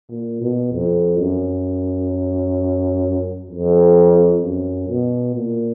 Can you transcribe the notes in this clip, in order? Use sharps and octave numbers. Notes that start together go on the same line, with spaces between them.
A#2
B2
F2
F#2
F2
F#2
B2
A#2